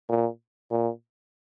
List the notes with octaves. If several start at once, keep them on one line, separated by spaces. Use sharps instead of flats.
A#2
A#2